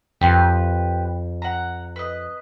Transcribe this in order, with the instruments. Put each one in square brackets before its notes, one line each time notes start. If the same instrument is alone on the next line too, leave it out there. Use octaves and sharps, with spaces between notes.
[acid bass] F2 [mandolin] G4 B4 C6
[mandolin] F#5 A#5
B4 D#5